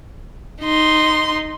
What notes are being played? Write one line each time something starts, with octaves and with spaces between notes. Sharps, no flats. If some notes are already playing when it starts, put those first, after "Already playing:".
D#4 C6